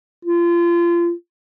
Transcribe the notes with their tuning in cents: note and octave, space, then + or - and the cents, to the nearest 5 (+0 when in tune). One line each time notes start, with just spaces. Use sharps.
F4 -30